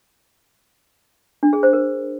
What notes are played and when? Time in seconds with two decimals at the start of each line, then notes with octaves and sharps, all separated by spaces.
1.43 D4
1.53 G#4
1.63 C5
1.73 A#4